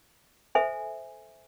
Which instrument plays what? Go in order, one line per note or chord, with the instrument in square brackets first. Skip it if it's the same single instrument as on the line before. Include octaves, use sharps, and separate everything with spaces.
[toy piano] A4 C5 E5 G#5